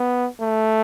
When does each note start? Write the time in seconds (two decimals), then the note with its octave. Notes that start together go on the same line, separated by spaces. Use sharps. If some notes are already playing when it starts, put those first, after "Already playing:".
Already playing: B3
0.41 A3